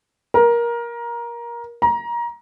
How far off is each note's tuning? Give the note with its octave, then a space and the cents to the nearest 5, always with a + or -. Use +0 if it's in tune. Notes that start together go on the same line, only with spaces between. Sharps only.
A#4 +20
A#5 +25